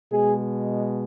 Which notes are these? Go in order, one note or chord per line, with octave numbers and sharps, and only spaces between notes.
B2 G#3 G#4